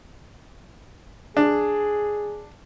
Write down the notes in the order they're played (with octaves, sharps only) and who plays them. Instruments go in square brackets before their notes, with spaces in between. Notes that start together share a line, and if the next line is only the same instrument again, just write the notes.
[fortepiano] D4 [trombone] G#4